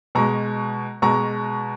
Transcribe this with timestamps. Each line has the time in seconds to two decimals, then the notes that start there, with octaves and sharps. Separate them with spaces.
0.15 B2 G#3 A#5 C#6
1.02 B2 G#3 A#5 C#6